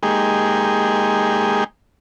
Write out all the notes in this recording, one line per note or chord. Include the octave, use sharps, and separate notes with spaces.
G#3 A#3 D#4 G4 G#4